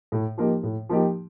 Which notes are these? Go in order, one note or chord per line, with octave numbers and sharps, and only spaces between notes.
A2
F3 A#3 D#4 G4
A2
F3 A#3 D#4 G4